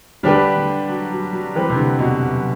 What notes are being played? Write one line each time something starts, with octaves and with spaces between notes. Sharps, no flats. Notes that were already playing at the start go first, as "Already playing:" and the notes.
D3 G3 D4 G4 B4
D3
F#3
F#3
F#3
E3 G3 C4 G4 B4
C3
D3
B2
F#2